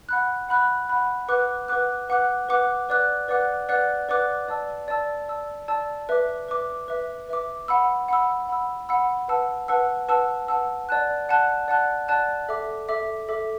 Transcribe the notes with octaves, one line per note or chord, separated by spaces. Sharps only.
F#5 B5 F#6
F#5 B5 F#6
F#5 B5 F#6
B4 F#5 D6 F#6
B4 F#5 D6 F#6
B4 F#5 D6 F#6
B4 F#5 D6 F#6
B4 D5 F#5 D6 F#6
B4 D5 F#5 D6 F#6
B4 D5 F#5 D6 F#6
B4 D5 F#5 D6 F#6
D5 A5 E6
D5 A5 E6
D5 A5 E6
D5 A5 E6
B4 E5 D6
B4 E5 D6
B4 E5 D6
B4 E5 D6
F#5 B5 E6
F#5 B5 E6
F#5 B5 E6
F#5 B5 E6
B4 F#5 A5 E6
B4 F#5 A5 E6
B4 F#5 A5 E6
B4 F#5 A5 E6
D5 F#5 A5 F#6
D5 F#5 A5 F#6
D5 F#5 A5 F#6
D5 F#5 A5 F#6
A4 E5 D6
A4 E5 D6
A4 E5 D6